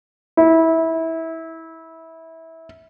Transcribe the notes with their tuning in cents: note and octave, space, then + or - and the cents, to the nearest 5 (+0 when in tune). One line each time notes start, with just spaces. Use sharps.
E4 -20